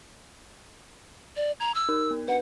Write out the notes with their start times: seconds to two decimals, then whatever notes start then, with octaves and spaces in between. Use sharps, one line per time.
1.36 D5
1.60 A#5 G#6
1.75 E6
1.89 D#4 A#4
2.11 B3
2.28 D4 B4 F#5